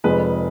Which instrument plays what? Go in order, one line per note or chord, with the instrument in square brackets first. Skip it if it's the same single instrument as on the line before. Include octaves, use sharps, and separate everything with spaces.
[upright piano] F1 F2 F3 G#3 G#4 B4